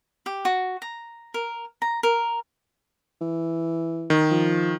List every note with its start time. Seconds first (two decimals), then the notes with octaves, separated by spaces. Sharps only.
0.26 G4
0.45 F#4
0.82 A#5
1.34 A#4
1.82 A#5
2.03 A#4
3.21 E3
4.10 D#3
4.31 F3